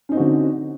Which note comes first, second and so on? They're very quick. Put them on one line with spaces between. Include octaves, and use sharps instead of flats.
C#4 D#4 C4 F#4 D3